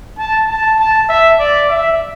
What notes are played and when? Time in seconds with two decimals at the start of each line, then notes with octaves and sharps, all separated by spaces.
0.19 A5
0.50 A5
0.79 A5
1.09 E5
1.39 D5
1.69 E5